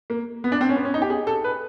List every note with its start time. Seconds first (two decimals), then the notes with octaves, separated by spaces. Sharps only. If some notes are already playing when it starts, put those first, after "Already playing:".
0.10 A#3
0.44 B3
0.52 D4
0.61 C4
0.69 C#4
0.76 B3
0.85 C#4
0.94 D#4
1.02 G4
1.10 G#4
1.27 A4
1.44 B4